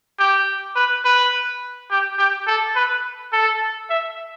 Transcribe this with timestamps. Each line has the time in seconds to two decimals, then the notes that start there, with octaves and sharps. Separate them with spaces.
0.19 G4
0.76 B4
1.05 B4
1.91 G4
2.18 G4
2.47 A4
2.76 B4
3.33 A4
3.90 E5